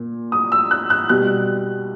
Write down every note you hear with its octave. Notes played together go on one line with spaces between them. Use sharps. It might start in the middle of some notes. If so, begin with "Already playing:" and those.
Already playing: A#2
D#6
E6
F#6
F#6
B2 G3 F#6